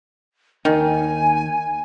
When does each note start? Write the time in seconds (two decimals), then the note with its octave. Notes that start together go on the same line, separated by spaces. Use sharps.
0.65 D#2 D#3 D#4 G#5